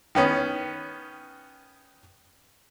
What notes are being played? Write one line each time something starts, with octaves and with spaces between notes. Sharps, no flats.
D#3 B3 C#4